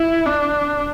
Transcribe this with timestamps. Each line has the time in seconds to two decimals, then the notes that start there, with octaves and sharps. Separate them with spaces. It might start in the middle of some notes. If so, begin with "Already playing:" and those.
Already playing: E4
0.26 D4